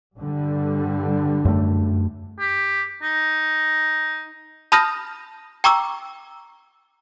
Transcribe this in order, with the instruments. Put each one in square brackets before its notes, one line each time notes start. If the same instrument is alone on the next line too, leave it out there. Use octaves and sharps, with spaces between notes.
[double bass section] G2 D3 G3
[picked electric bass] F#2 A3
[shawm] G4
D#4
[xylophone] A5 B5 D#6 F6 G6 A#6
G5 A#5 C#6 D6 E6